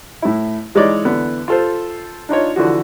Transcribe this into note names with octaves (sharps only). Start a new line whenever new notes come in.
A2 E4
E3 G#3 D#4 C#5 D5
D3 E3 B3
F4 A4 C5
D4 D#4 F4 C#5
D3 E3 F3 F#4